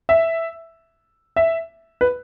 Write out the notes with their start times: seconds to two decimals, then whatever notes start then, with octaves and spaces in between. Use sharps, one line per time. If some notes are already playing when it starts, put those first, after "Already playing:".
0.09 E5
1.36 E5
2.01 B4